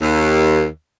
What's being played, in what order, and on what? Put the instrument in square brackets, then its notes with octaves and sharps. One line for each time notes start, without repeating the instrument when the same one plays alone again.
[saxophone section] D#2